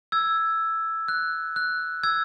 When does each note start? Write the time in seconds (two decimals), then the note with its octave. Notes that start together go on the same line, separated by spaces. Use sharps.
0.12 E6 G#6
1.08 F#6
1.56 F#6
2.03 E6 G#6